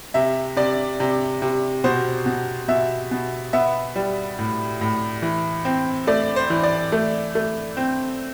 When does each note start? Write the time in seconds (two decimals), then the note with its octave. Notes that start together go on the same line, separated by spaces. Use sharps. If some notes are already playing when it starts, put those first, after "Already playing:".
0.14 C3 E5
0.56 C3 D5
1.00 C3
1.42 C3
1.84 B2 C5
2.26 B2
2.68 B2 E5
3.11 B2
3.53 B3 E5
3.96 G3
4.39 A2
4.81 A2
5.22 E3
5.65 C4
6.07 A3 D5
6.36 C5
6.50 E3
6.63 D5
6.92 A3
7.35 A3
7.77 C4